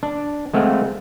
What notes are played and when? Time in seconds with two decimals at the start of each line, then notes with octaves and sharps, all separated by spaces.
0.03 D4
0.53 G#3 A3 C4 F5 F#5